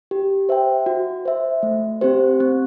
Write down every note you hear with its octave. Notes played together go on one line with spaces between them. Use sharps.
G4
C5 E5 G5
F#4
C5 E5
A3
C4 G4 C5
C4